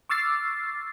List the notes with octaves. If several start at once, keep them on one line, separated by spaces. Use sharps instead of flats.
C#6 D6 E6 F6 A6 C7